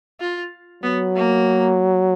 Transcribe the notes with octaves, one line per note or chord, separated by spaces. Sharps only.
F4
F#3 B3
A#3